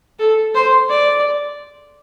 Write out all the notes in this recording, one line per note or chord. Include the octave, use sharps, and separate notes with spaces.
A4
C5
D5